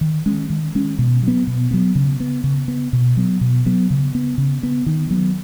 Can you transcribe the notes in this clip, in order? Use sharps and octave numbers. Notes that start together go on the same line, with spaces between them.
D#3
G#3 C#4
D#3
G#3 C#4
B2
F#3 B3
B2
F#3 B3
C#3
B3
C#3
B3
B2
F#3 B3
B2
F#3 B3
C#3
B3
C#3
B3
D#3
F#3 B3